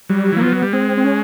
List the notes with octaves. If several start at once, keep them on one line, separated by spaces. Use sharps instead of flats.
F#3 G3
E3 A#3
F3 B3
F#3
G3
G#3 C4
C4
C#4